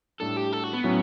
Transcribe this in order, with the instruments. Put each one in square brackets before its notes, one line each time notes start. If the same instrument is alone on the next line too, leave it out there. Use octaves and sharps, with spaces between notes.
[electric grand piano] A2 G3 D4 [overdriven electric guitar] A4
[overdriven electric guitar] G4
A4
F#4
B3
[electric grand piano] A2 F#3 C#4